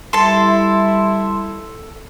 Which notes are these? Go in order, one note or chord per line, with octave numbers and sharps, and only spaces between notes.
G3 E4 A4 A5 C6